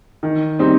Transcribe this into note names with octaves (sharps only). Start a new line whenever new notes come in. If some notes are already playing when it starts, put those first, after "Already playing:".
D#3
G3 C4 D#4